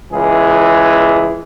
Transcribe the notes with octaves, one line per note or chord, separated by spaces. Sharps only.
C#2 E3 G#4